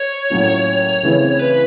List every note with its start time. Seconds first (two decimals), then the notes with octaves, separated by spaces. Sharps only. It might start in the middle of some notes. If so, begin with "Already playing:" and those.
Already playing: C#5
0.30 A2 F#3 A#3 C#4 F4
1.03 C#3 E3 A3 C4
1.39 B4